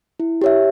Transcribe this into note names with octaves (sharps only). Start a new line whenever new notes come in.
E4
G4 C#5 E5